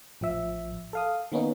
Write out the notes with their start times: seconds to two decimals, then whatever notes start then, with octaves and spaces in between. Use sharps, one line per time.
0.21 A1 F3 E5
0.93 A4 F5 D#6
1.32 D#3 A#3 B3 C#4 D#4